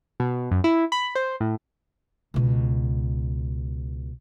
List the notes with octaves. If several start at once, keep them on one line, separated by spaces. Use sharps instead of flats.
B2
F#2
E4
B5
C5
A2
C#2 B2